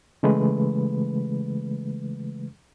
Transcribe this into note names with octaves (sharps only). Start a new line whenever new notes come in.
C#3 E3 G#3 A3 B4